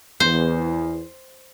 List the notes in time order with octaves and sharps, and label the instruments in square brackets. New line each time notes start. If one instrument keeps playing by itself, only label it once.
[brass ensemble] E2 [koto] C5